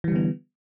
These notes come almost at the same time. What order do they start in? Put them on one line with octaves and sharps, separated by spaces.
E3 G3 D3 B3